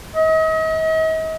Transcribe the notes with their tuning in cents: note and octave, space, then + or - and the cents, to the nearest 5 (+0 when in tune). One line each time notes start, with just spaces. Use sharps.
D#5 +40